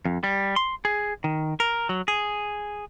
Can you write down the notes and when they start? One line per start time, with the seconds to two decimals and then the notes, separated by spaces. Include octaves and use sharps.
0.05 F2
0.23 G3
0.56 C6
0.85 G#4
1.24 D#3
1.60 A#4
1.89 F#3
2.08 G#4